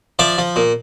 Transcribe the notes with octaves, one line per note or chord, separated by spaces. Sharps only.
F3 D5 E5
F3
A#2